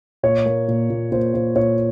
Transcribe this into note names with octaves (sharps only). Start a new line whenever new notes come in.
A#2 C#5
A#3
A#2
A#2
A#2 C5
A#2 C5
A#2 C#5